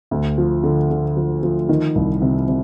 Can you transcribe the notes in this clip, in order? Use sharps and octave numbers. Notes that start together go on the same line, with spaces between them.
D2
F3
D3
D3
F3
F3
D#3
C2
C3
C3